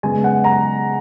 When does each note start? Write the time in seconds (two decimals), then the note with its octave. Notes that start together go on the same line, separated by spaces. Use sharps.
0.03 C#3 G#3 B3 G#5
0.24 F#5
0.44 A#5